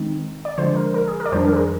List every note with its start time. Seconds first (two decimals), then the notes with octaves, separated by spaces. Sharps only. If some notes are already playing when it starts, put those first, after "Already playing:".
Already playing: D#3 G#3 C4 D#4
0.45 D5
0.58 D3 F3 G#3 C5
0.76 A#4
0.94 A#4
1.08 G#4
1.20 A#4
1.26 D5
1.32 F2 D#3 G3 D4 C5
1.45 A#4
1.53 G#4
1.56 A#4